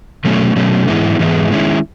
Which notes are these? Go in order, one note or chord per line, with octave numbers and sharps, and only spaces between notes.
B2 F#3 A3 C#4
B2 F#3 A3 C#4
G#2 E3 G#3 B3 E4
G#2 E3 G#3 B3 E4
D#3 G#3 C#4 E4